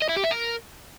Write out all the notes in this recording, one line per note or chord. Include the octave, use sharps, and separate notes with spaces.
D#5
E4
G4
E5
A#4